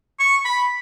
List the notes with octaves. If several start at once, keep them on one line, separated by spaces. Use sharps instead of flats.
C#6
B5